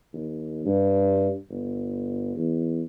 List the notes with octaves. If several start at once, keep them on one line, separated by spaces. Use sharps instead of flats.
D#2
G2
G1
E2